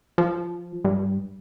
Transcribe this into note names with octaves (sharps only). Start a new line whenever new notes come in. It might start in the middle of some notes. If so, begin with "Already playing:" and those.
F3
G2